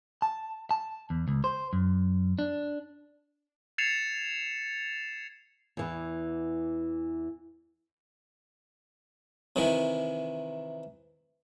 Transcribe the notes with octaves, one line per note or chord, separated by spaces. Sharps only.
A5
A5
E2
C#2
C5
F#2
D4
G#6 A6 C7 C#7 E7 F7
E2 E3 B3
C3 D#3 E3